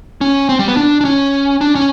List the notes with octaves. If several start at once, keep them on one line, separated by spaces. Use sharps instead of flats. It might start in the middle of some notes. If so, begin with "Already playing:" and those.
C#4
C4
G3
B3
D4
D4
C#4
D4
C#4